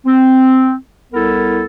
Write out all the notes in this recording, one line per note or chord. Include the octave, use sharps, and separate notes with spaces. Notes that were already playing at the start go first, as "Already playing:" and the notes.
C4
C2 B3 E4 A4 A#4